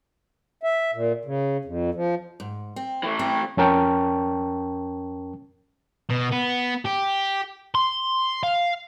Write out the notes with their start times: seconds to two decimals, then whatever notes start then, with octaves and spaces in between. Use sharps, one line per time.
0.63 E5
0.94 A#2
1.25 C#3
1.65 F2
1.95 F3
2.40 G#2
2.76 C4
3.03 E3 A3
3.19 C4
3.57 F2 C#4 A#4 G5 A5 C#6
6.10 B2
6.32 B3
6.86 G4
7.75 C6
8.43 F5